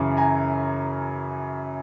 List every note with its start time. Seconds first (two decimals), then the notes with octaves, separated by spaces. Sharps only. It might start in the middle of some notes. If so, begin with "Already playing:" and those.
Already playing: F#2 C#3 E3
0.17 G#5 A#5